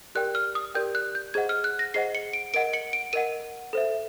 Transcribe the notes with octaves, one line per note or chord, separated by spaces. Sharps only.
G4 A#4 D5 G5 F#6
F6
D#6
G4 A#4 D5 G5 G6
F#6
G6
G#4 C5 D#5 F#5 G#6
F6
F#6
A#6
G#4 C5 D#5 F#5 C7
C#7
D7
A#4 D#5 F#5 D7
C#7
D7
A#4 D#5 F#5 D#7
A4 C5 E5